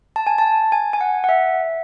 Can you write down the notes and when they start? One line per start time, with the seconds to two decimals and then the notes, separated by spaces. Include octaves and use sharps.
0.16 A5
0.27 G#5
0.38 A5
0.72 G#5
0.93 G#5
1.01 F#5
1.24 F#5
1.29 E5